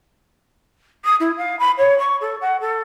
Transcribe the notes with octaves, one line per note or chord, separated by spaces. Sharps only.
D#6
E4
F5
B5
C#5
C#6
A4
F#5
A4